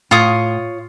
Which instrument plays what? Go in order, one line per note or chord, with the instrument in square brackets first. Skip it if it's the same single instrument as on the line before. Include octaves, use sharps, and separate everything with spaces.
[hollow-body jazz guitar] A2 [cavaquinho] F4 C#5 D#6